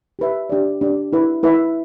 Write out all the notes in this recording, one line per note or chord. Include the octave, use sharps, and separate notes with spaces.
G4 B4 E5
D4 G4 D5
D4 G4 D5
E4 B4 E5
E4 B4 E5